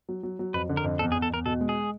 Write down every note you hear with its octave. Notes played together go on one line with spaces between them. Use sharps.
F#3
F#3
F#3
F2 B4
D3
A#4
F2
E2 A4
G#4
E2
A4
E2 A#4
B2 A4
G#3
G#4